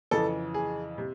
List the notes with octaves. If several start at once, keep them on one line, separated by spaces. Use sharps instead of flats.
F2 C#3 E3 A4
G#4
C3